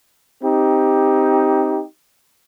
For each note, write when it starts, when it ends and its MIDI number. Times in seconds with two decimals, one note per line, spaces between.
0.43 1.82 60
0.43 1.82 63
0.43 1.82 67